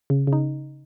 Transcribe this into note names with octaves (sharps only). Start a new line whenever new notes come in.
C#3
C#3
D#4